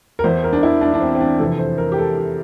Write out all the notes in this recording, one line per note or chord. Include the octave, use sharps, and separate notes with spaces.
A#4
E2 E3 C5
A#4
D4
E4
D4
D4
C4
C4
D4
F2 C3 E3 A4
C5
A#4
G4
A4
G4